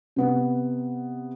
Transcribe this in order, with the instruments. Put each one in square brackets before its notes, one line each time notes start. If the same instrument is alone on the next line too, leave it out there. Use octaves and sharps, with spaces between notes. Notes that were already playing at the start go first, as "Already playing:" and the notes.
[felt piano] C3 B3